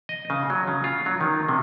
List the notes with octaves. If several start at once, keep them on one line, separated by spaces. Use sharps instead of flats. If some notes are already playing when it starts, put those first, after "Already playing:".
D#5
C#3
F#3
C#3
F4
F#3
D#3
C3